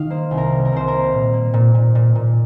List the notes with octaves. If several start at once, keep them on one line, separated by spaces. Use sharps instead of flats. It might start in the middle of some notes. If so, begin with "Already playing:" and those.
Already playing: D#3 D#5 F5
A#3 C5
C2
A#4
C3
A#4
C2 C5
A#3 A#4
A#2
A#3
A#2
A#2
A#2
A#2